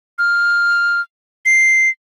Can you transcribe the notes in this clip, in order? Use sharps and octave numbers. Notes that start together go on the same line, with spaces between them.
F6
C7